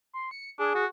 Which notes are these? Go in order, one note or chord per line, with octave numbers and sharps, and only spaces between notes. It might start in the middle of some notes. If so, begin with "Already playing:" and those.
C6
C#7
D4 G#4
F#4